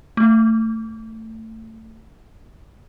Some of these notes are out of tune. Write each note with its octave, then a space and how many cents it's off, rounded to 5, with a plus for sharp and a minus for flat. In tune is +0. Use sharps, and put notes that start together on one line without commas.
A3 +20